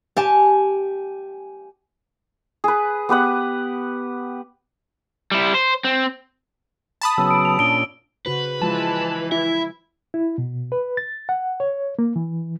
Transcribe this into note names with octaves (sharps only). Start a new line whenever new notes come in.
G4 G#5 A5
G#4 B4
B3 G4 B4 F#5
G3 E4
C5
C4
A5 B5 D#6
C#3 F#3 B3 E6
D7
F7
A#2 C#4 D4 D7 G7
C#3 F#4 B4 C5
E3 F3 G#3 F4 A5
E4 E5
E4
B2
B4
A6
F#5
C#5
A#3
E3